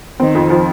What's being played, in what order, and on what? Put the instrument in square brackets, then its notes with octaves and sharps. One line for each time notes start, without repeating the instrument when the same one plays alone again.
[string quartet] D#3 [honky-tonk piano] C4
[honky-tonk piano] F2
F3